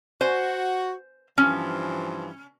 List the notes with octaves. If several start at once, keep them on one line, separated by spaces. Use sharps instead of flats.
F#4 C5 G#5
G2 E3 F3 C#4